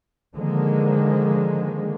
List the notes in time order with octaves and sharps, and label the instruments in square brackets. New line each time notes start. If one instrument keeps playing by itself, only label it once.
[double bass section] D3 D#3 F3 G#3 A#3